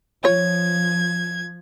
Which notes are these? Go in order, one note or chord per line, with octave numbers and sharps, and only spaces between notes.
F3 F4 C#5 G#6